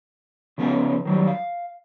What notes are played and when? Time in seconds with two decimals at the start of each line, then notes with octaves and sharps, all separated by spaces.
0.58 C#3 F3 B3 C#4 F4 G#4
1.05 D#3 F#3 G3
1.27 F5